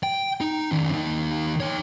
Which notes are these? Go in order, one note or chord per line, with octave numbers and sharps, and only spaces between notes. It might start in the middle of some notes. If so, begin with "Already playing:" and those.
G5
D#4
D#3 C#4
D#2 D#4
D#4 C#5